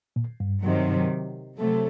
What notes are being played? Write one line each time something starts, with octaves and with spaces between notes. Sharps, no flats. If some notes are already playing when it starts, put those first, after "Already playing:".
A#2
G2
C3 D#3 F#3
C3 F#3 A3